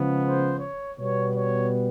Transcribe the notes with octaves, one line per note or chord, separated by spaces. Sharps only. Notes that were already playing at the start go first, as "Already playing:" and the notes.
Already playing: C#3 F3 G#3 B3
C5
C#5
B2 G3 B3 C#5
C#5